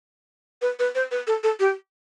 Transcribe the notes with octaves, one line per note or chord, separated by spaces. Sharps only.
B4
B4
C5
B4
A4
A4
G4